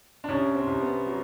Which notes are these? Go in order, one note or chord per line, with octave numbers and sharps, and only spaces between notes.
D4
C2 C#4
C4
C2
B3
F#3